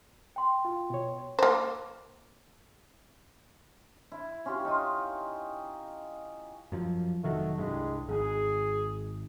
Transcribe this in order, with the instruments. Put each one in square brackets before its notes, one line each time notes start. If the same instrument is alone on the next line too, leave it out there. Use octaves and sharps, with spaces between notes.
[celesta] G5 C6
[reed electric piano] F4
B2 C#5
[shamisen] A#3 C5
[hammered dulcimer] E4
C#4 F4 G4
D#4 F4
[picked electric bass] F#2 F3
[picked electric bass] F1 D#3 F#3 [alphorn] A3
[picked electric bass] C2 G2 [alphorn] G#3
[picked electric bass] G#1 [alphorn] G#4